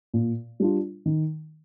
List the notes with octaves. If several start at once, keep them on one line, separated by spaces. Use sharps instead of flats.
A#2
G3 D4 F4
D#3